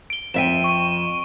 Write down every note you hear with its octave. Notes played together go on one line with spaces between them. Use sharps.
D7 G7
F2 E5 G5 D#7 E7
C#6